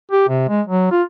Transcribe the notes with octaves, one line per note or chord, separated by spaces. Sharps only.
G4
C3
G#3
F#3
F4